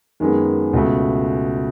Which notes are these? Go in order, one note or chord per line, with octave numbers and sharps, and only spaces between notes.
F#2 D#3 G#3 B3
C#2 B2 A3